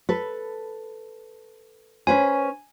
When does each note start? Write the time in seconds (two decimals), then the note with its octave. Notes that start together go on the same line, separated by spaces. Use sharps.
0.09 A4 B4
2.07 C#4 B4 C5 G#5